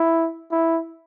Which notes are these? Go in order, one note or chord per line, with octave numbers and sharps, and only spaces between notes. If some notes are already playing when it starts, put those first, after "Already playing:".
Already playing: E4
E4